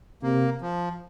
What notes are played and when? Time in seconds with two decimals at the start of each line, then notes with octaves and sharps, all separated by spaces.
0.23 C3 A#3
0.62 F3